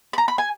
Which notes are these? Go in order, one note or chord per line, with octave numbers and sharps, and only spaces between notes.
B5
A#5
B5
G#5